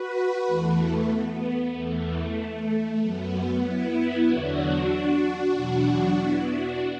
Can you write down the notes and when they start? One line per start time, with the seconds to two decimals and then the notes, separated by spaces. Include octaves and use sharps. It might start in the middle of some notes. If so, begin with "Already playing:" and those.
Already playing: F#4 B4
0.47 E2 E3 A3
1.11 B3
1.74 E2 E3 A3
3.01 F#2 F#3 B3
3.64 B3 E4
4.28 E2 D3 F#3 D4 F#4
5.55 E2 B2 F#3
6.17 B3 E4
6.50 D4 F#4